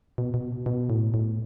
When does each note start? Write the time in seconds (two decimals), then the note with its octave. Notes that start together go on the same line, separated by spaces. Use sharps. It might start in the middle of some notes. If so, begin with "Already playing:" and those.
0.18 B2
0.34 B2
0.66 B2
0.90 A2
1.14 A2